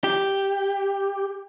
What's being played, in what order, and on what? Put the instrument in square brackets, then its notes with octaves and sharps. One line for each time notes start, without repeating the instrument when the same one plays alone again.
[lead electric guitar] G4